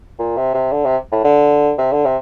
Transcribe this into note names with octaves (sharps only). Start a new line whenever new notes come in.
A#2
C3
C3
D3
C3
A2
D3
C3
D3
C3